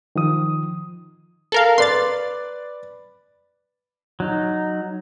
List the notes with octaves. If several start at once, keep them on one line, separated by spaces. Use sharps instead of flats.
D#3 F3 D#6
A4 A#4 F5
B4 D5 C6 A6
F#3 D#4